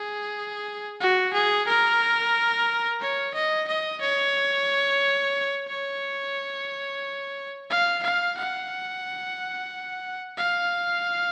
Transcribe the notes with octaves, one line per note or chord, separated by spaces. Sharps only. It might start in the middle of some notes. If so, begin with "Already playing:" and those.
Already playing: G#4
F#4
G#4
A#4
C#5
D#5
D#5
C#5
C#5
F5
F5
F#5
F5